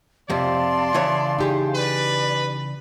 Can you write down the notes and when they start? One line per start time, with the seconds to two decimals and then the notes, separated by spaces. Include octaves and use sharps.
0.30 F2 C3 D5 F5 A5 C6
0.94 C#3 E3 C#5
1.38 D#4 G4 G#4
1.75 B4 D5